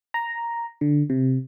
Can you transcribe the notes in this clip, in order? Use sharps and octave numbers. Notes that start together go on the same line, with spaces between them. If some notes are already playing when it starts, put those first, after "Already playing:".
A#5
D3
C3